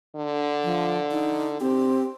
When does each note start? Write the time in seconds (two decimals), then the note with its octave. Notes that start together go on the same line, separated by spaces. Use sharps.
0.16 D3
0.64 F3
1.11 D#4
1.61 C4 G4